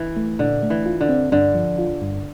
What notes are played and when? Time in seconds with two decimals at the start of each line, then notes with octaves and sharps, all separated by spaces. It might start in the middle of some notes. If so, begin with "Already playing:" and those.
Already playing: E3
0.16 A3
0.39 A#2 D3
0.63 A3
0.70 E3
0.86 F4
1.01 D3
1.09 C4
1.32 G2 D3
1.55 F3
1.78 F4
2.02 G2